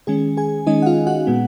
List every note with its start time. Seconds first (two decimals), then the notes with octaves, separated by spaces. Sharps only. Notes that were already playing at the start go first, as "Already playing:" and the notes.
0.07 D#3 G#3 C#4 G#4 G#5
0.37 G#4 G#5
0.67 D#3 G#3 C#4 D#4 D#5
0.82 F#5
0.86 F4 F5
1.07 F#4 F#5
1.27 A#2 G#3 B3